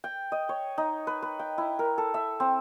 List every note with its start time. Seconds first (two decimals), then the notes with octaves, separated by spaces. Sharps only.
0.04 G5
0.32 D#5
0.49 C#5
0.78 D#4
1.07 B4
1.22 B4
1.39 G5
1.58 E4
1.79 A#4
1.98 A4
2.14 E5
2.40 C4